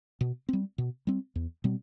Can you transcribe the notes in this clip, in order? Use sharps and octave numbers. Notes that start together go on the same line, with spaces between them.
B2
G3 C4
B2
G3 C4
E2
B2 G3 C4